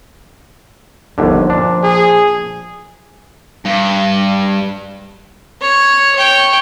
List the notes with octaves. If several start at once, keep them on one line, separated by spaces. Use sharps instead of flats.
G1 D#2 D3 F3
A#2 D4
G#4
G2
C#5
C#5 G5